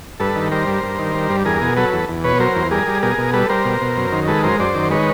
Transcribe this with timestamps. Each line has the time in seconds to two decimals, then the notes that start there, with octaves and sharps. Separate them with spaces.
0.20 G2 A4 B4
0.36 D#3
0.51 G3 A#4 C5
0.67 G2
0.83 G2
0.99 D#3
1.14 G3
1.30 G2
1.45 E2 G#4 A#4
1.61 B2
1.77 F#3 A4 B4
1.93 E2
2.09 E2
2.24 B2 B4 C#5
2.39 F#3 A#4 C5
2.56 E2
2.71 G3 G#4 A#4
2.87 G3
3.02 B2 G#4 A#4
3.18 B2
3.33 G3 A4 B4
3.49 G3 A#4 C5
3.65 B2
3.82 B2
3.97 F#2
4.12 D#3
4.27 G#3 A4 B4
4.44 F#2 A#4 C5
4.59 F#2 C5 D5
4.75 D#3
4.90 G#3 B4 C#5